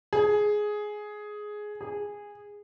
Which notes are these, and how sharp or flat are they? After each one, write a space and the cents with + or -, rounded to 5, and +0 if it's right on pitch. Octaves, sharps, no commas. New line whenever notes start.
G#4 +10
G#4 -10